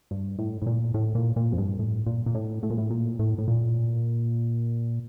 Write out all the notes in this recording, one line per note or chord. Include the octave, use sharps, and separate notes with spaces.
G2
A2
A2
A#2
A2
A#2
A#2
F2
G2
A2
A#2
A#2
A2
A2
A#2
A2
A#2
A2
A2
A#2